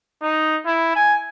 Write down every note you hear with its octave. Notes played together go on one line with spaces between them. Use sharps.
D#4
E4
G#5